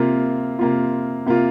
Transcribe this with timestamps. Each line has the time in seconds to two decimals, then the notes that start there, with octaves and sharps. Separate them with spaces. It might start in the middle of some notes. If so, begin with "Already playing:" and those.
Already playing: C3 A#3 F4
0.59 C3 A#3 F4
1.26 C3 A#3 F4